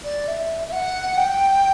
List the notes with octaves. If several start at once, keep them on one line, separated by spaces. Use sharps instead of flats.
D5
E5
E5
F#5
G5